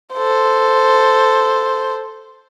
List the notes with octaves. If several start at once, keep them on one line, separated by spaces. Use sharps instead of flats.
A4 C5